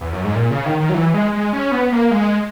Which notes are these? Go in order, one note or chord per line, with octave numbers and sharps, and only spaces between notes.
E2
F#2
G#2
A#2
C#3
D#3
D#3
F#3
E3
G#3
G#3
C#4
B3
A#3
G#3